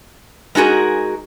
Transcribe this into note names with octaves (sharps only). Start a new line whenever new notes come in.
G#3 D#4 F#4 G#4 A#4